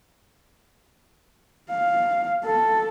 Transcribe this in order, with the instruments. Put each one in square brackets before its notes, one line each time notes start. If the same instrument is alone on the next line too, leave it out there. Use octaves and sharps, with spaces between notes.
[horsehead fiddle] F5
A4